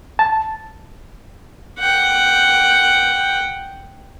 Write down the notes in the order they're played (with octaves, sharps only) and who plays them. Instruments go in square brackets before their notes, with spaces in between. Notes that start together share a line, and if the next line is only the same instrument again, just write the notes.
[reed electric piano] A5
[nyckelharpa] F#5 G5